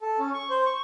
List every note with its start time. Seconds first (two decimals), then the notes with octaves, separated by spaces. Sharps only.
0.01 A4
0.19 C#4
0.34 C#6
0.50 C5
0.66 C#6